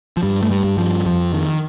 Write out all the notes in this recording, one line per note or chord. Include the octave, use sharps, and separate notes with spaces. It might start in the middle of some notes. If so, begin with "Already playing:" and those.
F3
G2 G3
A3
G3
G2
F3
F2 F3
D#3